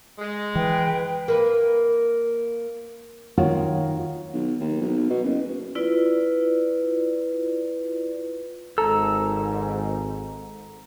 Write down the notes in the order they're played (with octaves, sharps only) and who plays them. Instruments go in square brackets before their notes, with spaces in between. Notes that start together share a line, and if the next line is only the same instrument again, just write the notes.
[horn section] G#3
[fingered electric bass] E3 [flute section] B4 G5
[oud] A#3 B4
[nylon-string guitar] D#3 F4 F#4 C#5
[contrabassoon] B1
D#2
B1
B2
F#1
[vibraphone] E4 F4 B4 D5
[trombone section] G#1 G#2 [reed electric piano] A4 [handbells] A#5 [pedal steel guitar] E6